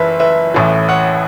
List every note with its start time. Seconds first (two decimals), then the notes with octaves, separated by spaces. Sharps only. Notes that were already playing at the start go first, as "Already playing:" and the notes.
Already playing: F#1 E3 B4 E5
0.20 B4 E5
0.54 A1 A2 E3
0.89 C#5 F#5